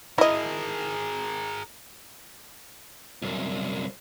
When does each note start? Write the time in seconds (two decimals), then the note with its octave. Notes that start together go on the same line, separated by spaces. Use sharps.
0.18 E4 G#4 A#4 D#5
3.22 C2 F#2